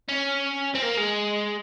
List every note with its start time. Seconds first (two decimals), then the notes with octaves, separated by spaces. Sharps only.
0.09 C#4
0.75 C4
0.82 A#3
0.97 G#3